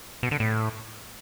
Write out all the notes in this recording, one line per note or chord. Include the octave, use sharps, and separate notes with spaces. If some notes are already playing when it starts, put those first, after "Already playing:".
B2
D3
A2